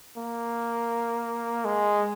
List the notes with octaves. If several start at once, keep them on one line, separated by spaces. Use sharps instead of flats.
A#3
G#3